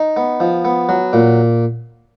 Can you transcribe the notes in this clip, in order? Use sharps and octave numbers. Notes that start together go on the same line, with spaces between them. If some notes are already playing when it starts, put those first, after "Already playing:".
Already playing: D#4
B3
F3
B3
F#3
A#2